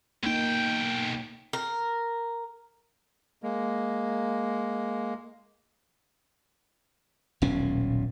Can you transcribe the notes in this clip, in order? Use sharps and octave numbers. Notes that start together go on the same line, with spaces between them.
B1 A#3 D#4 G5
A#4
G#3 A#3
D#1 B1 A#2 C#4